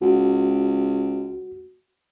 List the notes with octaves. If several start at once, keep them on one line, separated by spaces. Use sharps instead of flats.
C#2 F#4